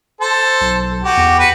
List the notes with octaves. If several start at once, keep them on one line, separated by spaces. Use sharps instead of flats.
A4 C5
B1
F#4 G4
E2
F#4 B4